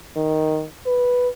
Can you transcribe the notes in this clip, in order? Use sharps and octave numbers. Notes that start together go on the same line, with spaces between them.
D#3
B4